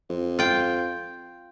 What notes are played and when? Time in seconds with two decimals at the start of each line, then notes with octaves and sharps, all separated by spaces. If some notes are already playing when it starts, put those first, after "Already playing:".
0.10 F2
0.39 F4 G5